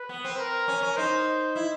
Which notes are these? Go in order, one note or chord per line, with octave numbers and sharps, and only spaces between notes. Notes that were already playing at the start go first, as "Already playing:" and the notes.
Already playing: B4
B3
C4
A#4
C#4
C#4
D#4 C5
E4